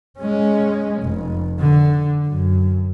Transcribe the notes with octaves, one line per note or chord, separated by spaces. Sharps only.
G#3 C#4
F1
D3
F#2